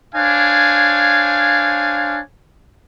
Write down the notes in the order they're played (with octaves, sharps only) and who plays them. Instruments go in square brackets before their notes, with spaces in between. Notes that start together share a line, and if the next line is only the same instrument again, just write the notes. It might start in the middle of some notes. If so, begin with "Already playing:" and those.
[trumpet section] D4 C5 C#5 F5 G#5